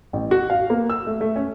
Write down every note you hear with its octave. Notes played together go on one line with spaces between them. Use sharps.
A1
F#4
F5
A#3
E6
A3
A3
C#4